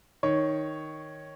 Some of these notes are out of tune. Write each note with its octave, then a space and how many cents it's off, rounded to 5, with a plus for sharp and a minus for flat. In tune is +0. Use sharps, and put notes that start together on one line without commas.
D#3 +0 C#5 +0